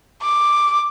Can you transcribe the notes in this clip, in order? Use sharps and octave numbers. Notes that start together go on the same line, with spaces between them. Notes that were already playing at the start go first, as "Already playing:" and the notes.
D6